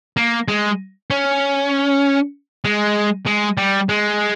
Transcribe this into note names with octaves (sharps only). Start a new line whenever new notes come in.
A#3
G#3
C#4
G#3
G#3
G3
G#3